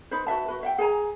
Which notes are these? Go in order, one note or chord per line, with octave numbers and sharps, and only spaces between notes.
D#4 B4 C5
F#4 B4 E5 A5
F#4 B4
E5 F#5 G5
G#4 A4 G#5 A#5